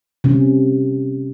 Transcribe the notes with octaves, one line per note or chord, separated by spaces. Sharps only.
C3 C#4